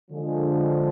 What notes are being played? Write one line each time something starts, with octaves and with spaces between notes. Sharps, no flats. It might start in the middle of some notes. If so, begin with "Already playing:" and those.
D3 F3 G#3